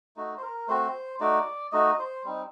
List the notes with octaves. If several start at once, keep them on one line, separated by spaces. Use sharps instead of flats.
A3 D#4 F#4
C5
A#4
A3 C4 F#4 C5
A3 D#4 F#4 D5
A3 D#4 F#4 D#5
C5
G3 C4 D#4